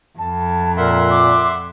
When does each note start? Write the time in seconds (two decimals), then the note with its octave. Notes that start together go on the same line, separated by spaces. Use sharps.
0.18 F2 A5
0.77 A#2 A#4 E5 F#5 C6
1.11 D6